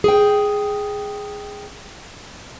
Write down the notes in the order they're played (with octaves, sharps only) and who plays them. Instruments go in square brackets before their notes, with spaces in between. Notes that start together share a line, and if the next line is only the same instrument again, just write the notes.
[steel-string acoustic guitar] G#4 G5